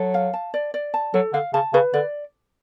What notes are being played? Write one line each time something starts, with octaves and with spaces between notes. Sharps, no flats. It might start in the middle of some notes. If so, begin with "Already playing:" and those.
Already playing: F#3 A4
F5
A5
D5
D5
A5
F#3 A4
D3 F5
C#3 A5
C#3 B4
D3 D5